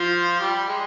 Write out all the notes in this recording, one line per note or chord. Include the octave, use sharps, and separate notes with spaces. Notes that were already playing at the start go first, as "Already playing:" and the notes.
Already playing: F3 F4
G3 G4
G#3 G#4